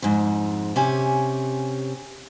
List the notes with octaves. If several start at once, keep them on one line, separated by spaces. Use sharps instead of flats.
F2 G#2
C3 C#4 G4 G#5